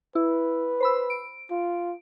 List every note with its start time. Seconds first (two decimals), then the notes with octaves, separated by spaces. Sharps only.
0.15 E4 B4
0.80 C5 B5 E6
1.10 D7
1.51 F4